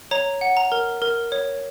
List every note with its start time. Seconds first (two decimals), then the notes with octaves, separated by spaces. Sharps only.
0.11 C#5 A#5
0.41 F#5
0.57 A#5
0.72 A#4
1.02 A#4
1.32 C#5